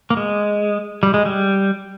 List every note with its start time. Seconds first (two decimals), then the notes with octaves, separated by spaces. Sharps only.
0.10 A#3
0.17 G#3
1.03 G3
1.14 G#3
1.25 G3